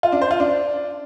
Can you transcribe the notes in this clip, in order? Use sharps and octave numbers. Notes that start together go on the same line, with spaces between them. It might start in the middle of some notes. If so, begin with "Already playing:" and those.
F4
D4
C5
F4
D4